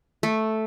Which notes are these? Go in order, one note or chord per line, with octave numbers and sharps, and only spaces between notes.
A3